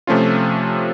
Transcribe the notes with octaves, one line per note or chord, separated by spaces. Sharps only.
C3 F3 A3 C#4 F4